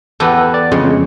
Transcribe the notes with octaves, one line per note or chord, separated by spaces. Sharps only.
E2 G4 A4 B4 G#5
D5
F2 C#3 G#3